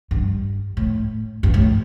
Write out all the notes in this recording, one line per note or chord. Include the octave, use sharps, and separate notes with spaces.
G2
A2
G2
A2